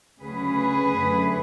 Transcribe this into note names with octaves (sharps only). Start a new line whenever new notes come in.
D2 C#3 F#3 C#4 G#4 B4
F#2 D3 F#3 A3